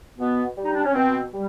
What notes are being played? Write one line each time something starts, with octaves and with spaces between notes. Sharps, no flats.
B2 B3
G3
D#4
D4
C#4
B2 C4
G3